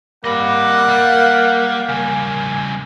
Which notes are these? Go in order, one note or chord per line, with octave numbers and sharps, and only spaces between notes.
G3 A#3 D#5 F#5 B5
G3 F5
C#3 G3 G#5